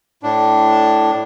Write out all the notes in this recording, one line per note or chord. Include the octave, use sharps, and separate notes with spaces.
A2 D4